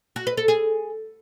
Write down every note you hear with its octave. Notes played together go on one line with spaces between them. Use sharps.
F#4
B4
A4
G#4